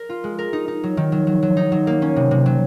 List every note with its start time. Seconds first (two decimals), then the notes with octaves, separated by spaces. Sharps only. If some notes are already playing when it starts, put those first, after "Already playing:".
Already playing: A#4
0.09 F4
0.24 G#3
0.39 A#4
0.53 D#4
0.68 D#4
0.83 F#3
0.97 D#3
1.12 F#3
1.27 F#3
1.43 F#3
1.57 D#4
1.72 F#3
1.87 A#3
2.02 C#4
2.16 C3
2.31 C3
2.46 F#3